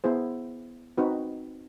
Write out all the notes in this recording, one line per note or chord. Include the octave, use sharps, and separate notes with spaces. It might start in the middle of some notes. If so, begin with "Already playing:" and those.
B3 E4 G#4 C5
C4 D#4 F#4 B4